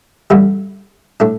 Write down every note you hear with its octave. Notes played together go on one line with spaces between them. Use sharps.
A1 G2 D3 G3 E4
A2 A3 D4